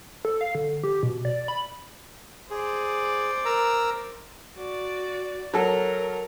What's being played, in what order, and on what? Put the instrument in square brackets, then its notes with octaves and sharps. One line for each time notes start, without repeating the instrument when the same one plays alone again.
[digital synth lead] A4
F5
D3
G4
B2
D5
B5
[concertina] G#4 [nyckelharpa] C5 D5
[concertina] A#4 A#5 E6
[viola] F#4 D5
[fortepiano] F#3 A4 [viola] A#4